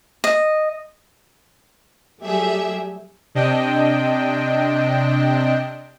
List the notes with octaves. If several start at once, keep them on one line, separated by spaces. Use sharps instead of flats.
D#5
F#3 G3 A3 G4 G#4 E5
C3 D4 D#5 G5